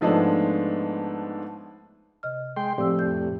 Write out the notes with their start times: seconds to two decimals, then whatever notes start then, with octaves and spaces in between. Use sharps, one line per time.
0.01 G#2 F3 G#3 A3 B3 D4
2.23 C3 D#5 F6
2.56 G#3 G5 C6
2.78 A2 F3 C4 G4 D5 E6
2.99 F2 G6